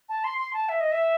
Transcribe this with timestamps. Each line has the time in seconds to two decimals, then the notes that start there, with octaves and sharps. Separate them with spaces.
0.09 A5
0.24 C6
0.38 C6
0.53 A5
0.69 E5
0.80 D#5
0.92 E5